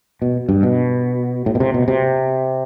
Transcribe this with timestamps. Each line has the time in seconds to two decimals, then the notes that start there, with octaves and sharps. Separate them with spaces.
0.22 B2
0.49 G2
0.63 B2
1.46 A2
1.55 B2
1.60 C3
1.74 B2
1.88 C3